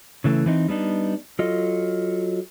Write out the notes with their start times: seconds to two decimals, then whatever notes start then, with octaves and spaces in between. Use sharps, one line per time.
0.24 C#3 E3 A3
0.46 E3 C4 D#4
0.68 G3 B3 D4 D#4
1.39 F#3 F4 A4 D#5